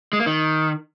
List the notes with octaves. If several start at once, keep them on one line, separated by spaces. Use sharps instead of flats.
G#3
A#3
D#3